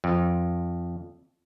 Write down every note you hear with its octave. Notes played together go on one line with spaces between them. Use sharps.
F2